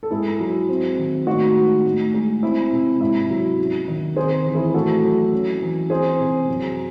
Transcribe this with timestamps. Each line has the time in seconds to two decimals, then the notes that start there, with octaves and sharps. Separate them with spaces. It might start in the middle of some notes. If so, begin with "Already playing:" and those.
0.03 A4
0.11 G#2 E4 G#4
0.40 F#3
0.69 C4
0.98 D#3
1.27 A2 D#4 F#4
1.56 G#3
1.85 A2
2.14 G#3
2.43 C4 E4
2.72 C3
3.01 G#2 E4
3.30 F#3
3.58 C#4
3.88 D#3
4.16 C4 G#4 C5
4.45 E3
4.55 E4 G#4
4.74 A2 F#4 A4
5.04 F#3
5.33 C#4
5.61 E3
5.90 C4 G#4 C5
6.19 C3
6.48 F#2